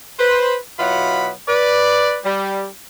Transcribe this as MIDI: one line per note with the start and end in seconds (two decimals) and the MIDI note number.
0.19 0.56 71
0.19 0.56 72
0.79 1.31 47
0.79 1.31 54
0.79 1.31 64
0.79 1.31 65
0.79 1.31 78
0.79 1.31 83
1.48 2.19 71
1.48 2.19 74
2.25 2.67 55